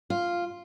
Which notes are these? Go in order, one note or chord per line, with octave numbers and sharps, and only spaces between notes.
F4